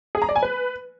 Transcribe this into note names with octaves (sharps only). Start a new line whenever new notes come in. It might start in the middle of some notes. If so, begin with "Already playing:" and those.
G#4
A#5
D5
G#5
B4